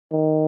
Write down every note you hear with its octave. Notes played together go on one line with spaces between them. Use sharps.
D#3